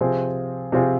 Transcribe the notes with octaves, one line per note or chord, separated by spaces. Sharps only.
C3 F3 C4 F4 G#4
C3 F3 C4 F4 G#4